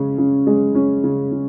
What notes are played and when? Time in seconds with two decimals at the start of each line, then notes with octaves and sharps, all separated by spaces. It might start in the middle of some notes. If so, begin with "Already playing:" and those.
Already playing: C#3 G#3 C#4
0.18 C#3
0.47 G#3
0.75 C#4
1.04 C#3
1.32 C#3